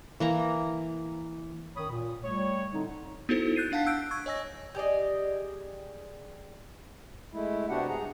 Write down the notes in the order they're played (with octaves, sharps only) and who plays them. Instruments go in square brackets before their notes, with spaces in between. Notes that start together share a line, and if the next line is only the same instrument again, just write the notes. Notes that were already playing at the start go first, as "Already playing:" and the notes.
[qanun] E3 A#3 A#5
[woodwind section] F#2 D#3 C#5 B5 D#6
A#2
G3 A3 C#5
A2 D3 C4 D#4
[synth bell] B3 D#4 E4 F#4 A4 C5
F#6 G6 A6 C7 D#7
D4 F5 F#5 A5 B6
E6 F#6 G6 D7
C#6 E6 G#6
C#5 D#5 G#5 E6 A#6
[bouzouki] G4 G#4 D5 D#5
[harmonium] G#3 A3 E4
C3 B3 D4 F#4 G4 F#5
G2 G#4 A#5